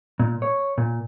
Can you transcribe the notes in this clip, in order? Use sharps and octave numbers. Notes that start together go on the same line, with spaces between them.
A#2
C#5
A#2